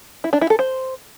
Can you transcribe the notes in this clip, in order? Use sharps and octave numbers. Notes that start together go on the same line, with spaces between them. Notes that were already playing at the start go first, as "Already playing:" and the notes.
E4
D4
E4
A4
C5